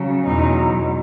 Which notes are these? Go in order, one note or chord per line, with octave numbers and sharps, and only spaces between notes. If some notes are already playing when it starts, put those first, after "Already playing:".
Already playing: C#3 F#3
E2 B2 F#3 D#4